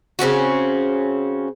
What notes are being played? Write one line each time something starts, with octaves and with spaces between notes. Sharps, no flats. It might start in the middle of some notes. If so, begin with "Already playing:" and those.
C#3 C4 C#4 F#4